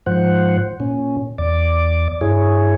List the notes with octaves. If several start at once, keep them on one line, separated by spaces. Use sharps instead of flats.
G#2 F3 C5 F#5
A#2 C#4
E2 D5 D6
G2 E4 G#4 C#5